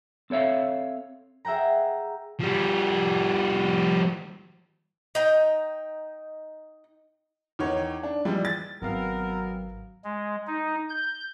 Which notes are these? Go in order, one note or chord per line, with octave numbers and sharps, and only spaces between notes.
C4 A4 C#5 E5 F5
G#4 E5 F#5 G5 A#5
F3 G3
D#4 G5
E2 D#3 C#5
D4
E3 F3 G3 G#3
A6
G#1 F#3 B3 C4 A#4 F5
G#3
D#4
G6